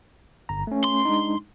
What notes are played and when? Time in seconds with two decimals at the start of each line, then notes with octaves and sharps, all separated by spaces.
0.49 G1 A#5
0.67 A3 C#4
0.84 C6
1.05 G#3 D4 D#4